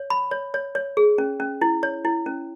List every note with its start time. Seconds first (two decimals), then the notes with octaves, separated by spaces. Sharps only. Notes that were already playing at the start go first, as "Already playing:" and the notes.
Already playing: C#5
0.10 B5
0.31 C#5
0.54 C#5
0.75 C#5
0.97 G#4
1.18 C#4
1.40 C#4
1.61 E4
1.83 C#5
2.05 E4
2.26 C#4